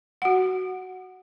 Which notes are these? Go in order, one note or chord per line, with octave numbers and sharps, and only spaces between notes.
F#4 F#5